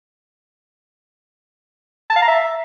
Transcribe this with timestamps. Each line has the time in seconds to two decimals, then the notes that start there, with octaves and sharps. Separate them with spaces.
2.10 A5
2.16 F5
2.22 A#5
2.28 E5